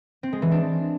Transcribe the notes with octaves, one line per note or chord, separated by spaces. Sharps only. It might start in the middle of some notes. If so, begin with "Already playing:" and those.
C4
G#3
E3
D4